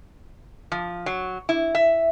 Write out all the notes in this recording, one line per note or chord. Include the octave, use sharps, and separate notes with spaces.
F3
F#3
E4
E5